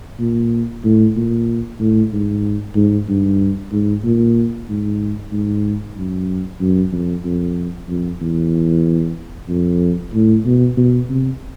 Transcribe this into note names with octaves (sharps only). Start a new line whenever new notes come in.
A#2
A2
A#2
A2
G#2
G#2
G2
G#2
A#2
G#2
G#2
F#2
F#2
F2
F2
F2
E2
F2
A2
B2
B2
C3